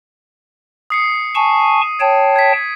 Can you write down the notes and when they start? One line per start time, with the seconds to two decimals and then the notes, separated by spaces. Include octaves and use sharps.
0.90 D#6 C7 C#7
1.35 G#5 A5 C#6 D#7
2.00 C#5 G5 A5 D7
2.36 G#6 B6